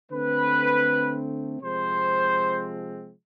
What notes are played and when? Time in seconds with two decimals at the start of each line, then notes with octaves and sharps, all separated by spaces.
0.11 D3 A3 C4 B4
1.62 C3 F3 G#3 C4 C5